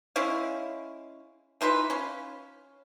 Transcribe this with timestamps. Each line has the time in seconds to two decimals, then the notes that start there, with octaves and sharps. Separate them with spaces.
0.16 G#3 C#4 E4 F5
1.61 E3 D#4 F4 B4
1.90 C#4 F5